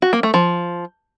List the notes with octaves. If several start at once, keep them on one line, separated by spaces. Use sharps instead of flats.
F#4
A#3
A3
F3